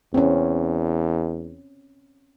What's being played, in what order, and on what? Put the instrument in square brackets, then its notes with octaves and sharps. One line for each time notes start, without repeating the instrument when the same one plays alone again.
[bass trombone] E2 [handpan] C4 C#4